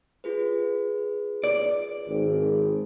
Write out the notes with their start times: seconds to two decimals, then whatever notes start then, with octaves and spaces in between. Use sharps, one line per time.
0.24 F4 G#4 B4
1.44 D5
2.08 G#1